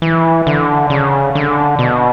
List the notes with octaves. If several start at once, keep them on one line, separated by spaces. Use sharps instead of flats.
E3
D3
C#3
D3
B2